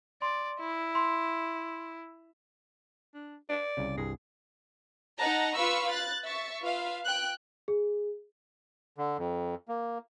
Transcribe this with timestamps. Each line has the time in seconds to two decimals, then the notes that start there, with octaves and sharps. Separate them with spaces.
0.22 D5 C6
0.60 E4
0.95 C6
3.15 D4
3.49 D5
3.77 C2 C#3
3.97 C2 G2 G#4
5.19 D#4 F#5 A5 A#5
5.55 F4 B4 F5 B5 C#6 E6
5.91 F#6 A6
6.24 E5 C#6 A6
6.62 F4 B4 E5 F5
7.05 G5 F#6
7.68 G#4
8.98 D3
9.18 F2
9.68 A#3